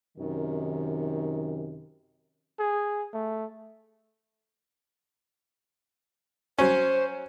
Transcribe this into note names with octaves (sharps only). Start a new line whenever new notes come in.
F#2 C3 D#3
G#4
A3
F#3 C#4 C5